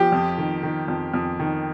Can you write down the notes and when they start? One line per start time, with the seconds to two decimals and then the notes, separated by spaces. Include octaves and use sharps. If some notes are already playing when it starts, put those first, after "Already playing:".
Already playing: F3 G4
0.12 F2
0.38 D#3
0.63 D#3
0.88 F2
1.14 F2
1.40 D#3